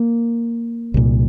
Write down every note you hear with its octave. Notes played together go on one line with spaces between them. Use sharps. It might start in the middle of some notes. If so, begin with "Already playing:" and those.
Already playing: A#3
C2 A#2